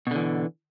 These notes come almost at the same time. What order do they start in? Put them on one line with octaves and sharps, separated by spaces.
B2 D3 E3